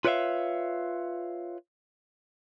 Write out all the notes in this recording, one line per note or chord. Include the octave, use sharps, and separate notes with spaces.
F4 B4 C#5 D5 E5 F5